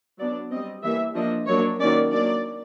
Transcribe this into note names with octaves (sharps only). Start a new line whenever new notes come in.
F#3 B3 D4 D5
G3 C4 D#5
E3 G3 A#3 E5
F3 A#3 D4 D#5
F#3 A#3 D4 C#5
D#3 F#3 A#3 C#4 D5
F#3 A#3 D4 D5